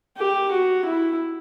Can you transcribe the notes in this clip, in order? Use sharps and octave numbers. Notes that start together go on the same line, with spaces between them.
G4
F#4
E4